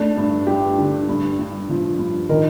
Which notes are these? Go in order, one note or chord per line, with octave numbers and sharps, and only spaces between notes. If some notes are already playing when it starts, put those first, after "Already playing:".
Already playing: A3 D4
G2
G2 G4
D3
G2
G2
F3
G2
D#3 A#4